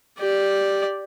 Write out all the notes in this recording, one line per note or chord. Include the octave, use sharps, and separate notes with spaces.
G4 D5